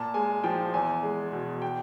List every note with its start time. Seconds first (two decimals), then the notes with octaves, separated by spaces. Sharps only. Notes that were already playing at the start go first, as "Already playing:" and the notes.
Already playing: A#2 A5
0.14 G#3 G#5
0.44 F3 G5
0.74 E2 G#5
1.03 G#3
1.32 B2
1.62 G5